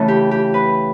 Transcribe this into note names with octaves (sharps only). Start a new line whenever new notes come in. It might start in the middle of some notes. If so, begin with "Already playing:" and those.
Already playing: C#3 E3 A3 A4
G4
G4
B4